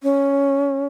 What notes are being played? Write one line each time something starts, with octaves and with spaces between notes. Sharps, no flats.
C#4